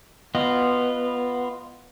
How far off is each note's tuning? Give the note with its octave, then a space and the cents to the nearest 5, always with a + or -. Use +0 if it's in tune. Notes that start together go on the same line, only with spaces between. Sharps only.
B3 +0 F4 -5 D#5 -20